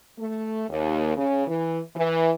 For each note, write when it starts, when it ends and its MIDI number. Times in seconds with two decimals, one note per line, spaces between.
0.19 0.65 57
0.69 1.14 39
1.17 1.46 49
1.47 1.79 52
1.96 2.33 52